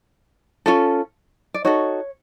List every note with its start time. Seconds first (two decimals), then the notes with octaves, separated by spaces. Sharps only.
0.66 C#4 F4 A4
1.54 D5
1.64 D#4 F#4 A4 C#5